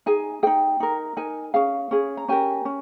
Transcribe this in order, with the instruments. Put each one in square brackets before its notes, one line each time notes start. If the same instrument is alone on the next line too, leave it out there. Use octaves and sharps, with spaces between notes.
[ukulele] D#4 G#4 G#5
D#4 G#4 G5
D#4 A#4
D#4 A#4 G#5
C#4 G#4 F5
C#4 G#4
A#5
C#4 G4 A#4 G#5
C#4